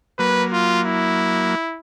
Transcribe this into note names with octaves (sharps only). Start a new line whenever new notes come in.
F#3 A#3 B4
F4
E4